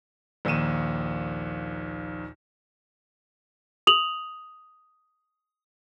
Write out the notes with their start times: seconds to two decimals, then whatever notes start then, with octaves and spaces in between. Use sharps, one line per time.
0.45 A#1 D#2 D#3 D#7 E7
3.87 D#6 F7 F#7